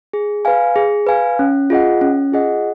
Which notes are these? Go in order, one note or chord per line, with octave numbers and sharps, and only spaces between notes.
G#4
B4 F5 G#5
G#4
B4 F5 G#5
C#4
F4 G#4 D#5 F#5
C#4
F4 G#4 D#5 F#5